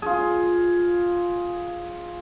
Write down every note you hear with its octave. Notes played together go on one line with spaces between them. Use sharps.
F4 G#4